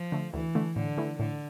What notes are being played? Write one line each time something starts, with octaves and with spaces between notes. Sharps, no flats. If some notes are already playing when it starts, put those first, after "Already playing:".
Already playing: F3
D3 A3
D2 E3
D3 A3
A2 D3
E3 A3 E4
A2 D3